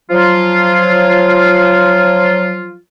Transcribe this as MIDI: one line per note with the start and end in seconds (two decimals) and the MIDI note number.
0.11 2.78 53
0.11 2.78 54
0.11 2.78 65